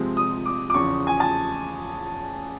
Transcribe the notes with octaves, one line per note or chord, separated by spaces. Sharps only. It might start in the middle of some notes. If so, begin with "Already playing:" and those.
Already playing: C3 F3 G#3 C4
D#6
D6
D6
E2 C#3 F3 C#6
G#5
A5